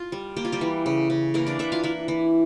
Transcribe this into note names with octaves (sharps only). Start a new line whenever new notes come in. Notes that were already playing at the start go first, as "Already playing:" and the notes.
Already playing: F4
G3
A#3 G4
F4
G3 G4
E3
C#3
C#3
E3 A#3 A#4
D4 D5
E3 E4 E5
F4 F5
E3 E4 E5
E3